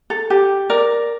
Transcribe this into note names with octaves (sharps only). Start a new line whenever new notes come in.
A4
G4
A#4 D5